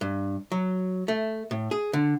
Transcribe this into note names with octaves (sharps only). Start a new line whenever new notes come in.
G2
F#3
A3
A2
G#4
D3